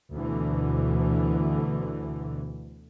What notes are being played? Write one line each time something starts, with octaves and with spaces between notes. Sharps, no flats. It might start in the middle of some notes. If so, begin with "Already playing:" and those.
D2 B2 D3 E3